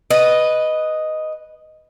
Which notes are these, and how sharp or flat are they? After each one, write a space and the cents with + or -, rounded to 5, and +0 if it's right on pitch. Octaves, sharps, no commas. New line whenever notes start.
B4 +0 D#5 +0